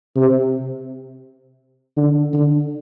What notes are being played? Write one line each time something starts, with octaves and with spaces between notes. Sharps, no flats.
C3
D3
D3